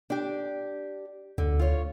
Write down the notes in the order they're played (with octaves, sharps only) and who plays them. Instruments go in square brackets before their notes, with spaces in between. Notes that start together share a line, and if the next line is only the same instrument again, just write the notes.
[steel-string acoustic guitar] D4 G4
[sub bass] D2 [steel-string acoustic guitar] D3
[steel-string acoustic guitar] F4 C#5